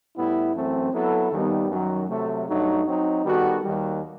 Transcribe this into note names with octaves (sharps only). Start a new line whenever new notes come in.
A2 G3 B3 E4
F#2 E3 A3 C4
F#3 B3 E4 A4
D#2 D#3 G3 B3 D#4
F#2 D#3 F#3
C3 F#3 A3
G2 F#3 A3 D#4
F#3 C4 D#4
D#3 G3 B3 F#4 A4
D#2 D#3 G3